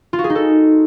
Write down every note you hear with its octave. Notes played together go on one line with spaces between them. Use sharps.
F4
F#4
G#4
D#4
A4